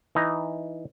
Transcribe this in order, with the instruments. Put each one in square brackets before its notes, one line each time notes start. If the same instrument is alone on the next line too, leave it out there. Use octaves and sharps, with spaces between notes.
[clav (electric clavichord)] E3 D#4